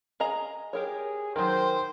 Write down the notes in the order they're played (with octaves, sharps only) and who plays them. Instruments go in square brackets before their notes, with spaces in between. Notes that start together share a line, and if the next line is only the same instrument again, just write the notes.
[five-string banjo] G#4 D#5 A#5
[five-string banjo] G4 A#4 C#5 [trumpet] G#4
[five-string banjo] D#3 F#3 [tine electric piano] A#4 [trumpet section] C5 [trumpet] G5